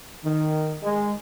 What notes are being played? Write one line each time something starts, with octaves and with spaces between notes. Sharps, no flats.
D#3
G#3